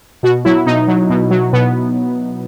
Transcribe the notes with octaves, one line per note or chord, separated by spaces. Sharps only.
B2 F#4
F#3 E4
B2 D#4
F#3
B2
F#3
B2 B3